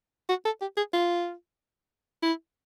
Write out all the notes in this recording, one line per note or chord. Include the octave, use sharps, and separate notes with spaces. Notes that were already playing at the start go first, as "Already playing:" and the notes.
F#4
A4
G4
G#4
F4
E4